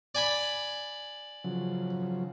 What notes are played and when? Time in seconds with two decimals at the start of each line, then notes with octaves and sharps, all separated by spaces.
0.15 D5 G#5 B5
1.44 C#3 F3 F#3